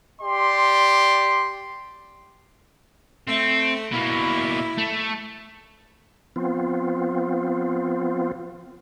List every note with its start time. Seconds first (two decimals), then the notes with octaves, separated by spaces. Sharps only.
0.22 G4 D5 C6
3.27 A3 C4
3.91 B2 A#3 E4
4.78 A3
6.36 F3 B3 C4 F4